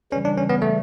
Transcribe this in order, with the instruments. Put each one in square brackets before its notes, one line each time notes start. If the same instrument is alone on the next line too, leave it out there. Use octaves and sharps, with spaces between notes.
[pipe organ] C#3 E3 G3 [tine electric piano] C#4
[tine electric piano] D4
C#4
B3
A3